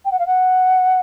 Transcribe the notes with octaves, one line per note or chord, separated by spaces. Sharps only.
G5
F#5
F5
F#5